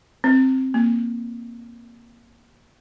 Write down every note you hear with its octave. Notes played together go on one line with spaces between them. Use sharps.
C4
A#3